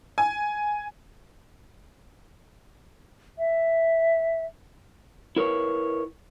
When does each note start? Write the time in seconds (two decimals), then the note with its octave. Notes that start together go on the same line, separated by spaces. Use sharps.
0.18 G#5
3.38 E5
5.36 E4 A#4 B4 C#5